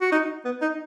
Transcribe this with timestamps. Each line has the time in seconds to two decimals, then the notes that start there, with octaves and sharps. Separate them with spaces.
0.01 F#4
0.12 D#4
0.45 B3
0.62 D#4